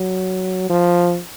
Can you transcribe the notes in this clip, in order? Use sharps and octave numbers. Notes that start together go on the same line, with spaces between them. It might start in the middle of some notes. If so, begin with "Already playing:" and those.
Already playing: F#3
F3